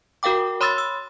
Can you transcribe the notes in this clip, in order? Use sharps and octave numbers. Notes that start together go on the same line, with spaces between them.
F#4 A#4 F5 G5 D6
C#5 B5 C6 D#6 E6 A6
E6